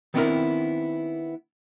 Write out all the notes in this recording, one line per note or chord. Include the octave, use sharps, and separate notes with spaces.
D#3 B3 C4 D4 E4 A#4